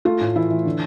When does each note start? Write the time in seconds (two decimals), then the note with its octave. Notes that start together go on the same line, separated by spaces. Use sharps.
0.05 A3 F4
0.21 A2
0.35 E3 E4
0.51 E3
0.66 D3